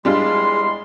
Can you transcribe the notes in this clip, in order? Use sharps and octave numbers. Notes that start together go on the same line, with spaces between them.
E2 G3 G#3 D4 E4 F4 C6